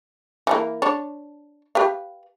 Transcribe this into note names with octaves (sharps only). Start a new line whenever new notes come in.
E3 G3 A#3
D4 C#5
G4 B4 F5